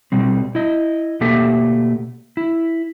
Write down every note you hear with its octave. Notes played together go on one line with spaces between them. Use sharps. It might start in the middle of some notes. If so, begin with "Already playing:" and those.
B2 G3 C4
E4 D#5
B2 A3 A#3 G4 A4 E5
E4